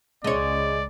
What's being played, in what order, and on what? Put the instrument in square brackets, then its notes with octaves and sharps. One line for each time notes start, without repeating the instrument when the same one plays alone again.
[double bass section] C#2 C#3 [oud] G#3 C#5 [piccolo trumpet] D5